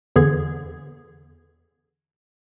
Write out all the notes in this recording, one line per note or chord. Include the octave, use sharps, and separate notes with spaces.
E2 D3 E3 G#4 G#6